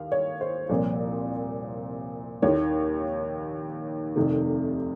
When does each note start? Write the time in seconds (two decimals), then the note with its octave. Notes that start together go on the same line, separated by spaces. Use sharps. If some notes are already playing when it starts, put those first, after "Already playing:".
Already playing: D#2 F5
0.12 C#5
0.41 C5
0.69 C2 A#2 F3
2.42 D#2 D#3 C#5
4.16 F1 F2 C3 D#3